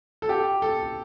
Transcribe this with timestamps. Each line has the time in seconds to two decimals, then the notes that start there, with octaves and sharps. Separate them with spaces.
0.22 A4
0.29 G4
0.62 A4